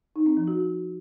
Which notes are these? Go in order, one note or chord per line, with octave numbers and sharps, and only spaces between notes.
D#4
C4
F3
F#4